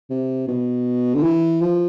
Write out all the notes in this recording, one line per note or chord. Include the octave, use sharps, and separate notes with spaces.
C3
B2
D3
E3
F3